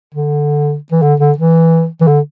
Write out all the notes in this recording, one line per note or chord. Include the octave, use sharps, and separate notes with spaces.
D3
E3
D3
D3
E3
E3
D3